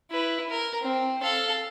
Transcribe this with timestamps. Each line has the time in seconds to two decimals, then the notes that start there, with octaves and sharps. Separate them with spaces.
0.11 E4 B4
0.50 A#4
0.82 C4
1.22 A4 F5